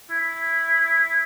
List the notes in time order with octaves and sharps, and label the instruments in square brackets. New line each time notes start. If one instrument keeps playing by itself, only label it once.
[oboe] E4